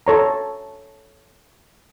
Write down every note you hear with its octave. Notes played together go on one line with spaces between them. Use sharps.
A4 C#5 A#5